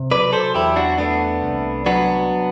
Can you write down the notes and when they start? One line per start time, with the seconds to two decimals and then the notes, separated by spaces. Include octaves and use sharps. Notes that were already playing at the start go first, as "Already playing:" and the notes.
Already playing: C3
0.11 F#3 B4 D5
0.32 A4 C5
0.55 E2 E4 G4
0.76 D4 F#4
0.98 A3 B3 D4
1.43 C2
1.86 F#3 B3 D4